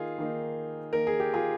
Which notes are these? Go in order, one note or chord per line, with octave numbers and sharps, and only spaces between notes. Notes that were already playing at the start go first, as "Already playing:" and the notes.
Already playing: D#3 A#3 D#4 F4 G#4
D#3 A#3 D#4
D#3 A#3 D#4 A#4
G#4
G4
F4 G#4